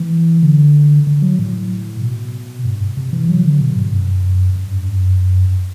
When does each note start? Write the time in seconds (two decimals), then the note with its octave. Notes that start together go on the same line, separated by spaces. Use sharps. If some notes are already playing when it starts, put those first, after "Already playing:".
Already playing: E3
0.43 D3
1.07 D3
1.22 F#3
1.39 A2
2.01 B2
2.65 G2
2.97 C3
3.13 E3
3.29 F#3
3.45 D3
3.61 B2
3.76 G2
3.92 F#2
4.56 F#2
4.71 G2
4.88 F#2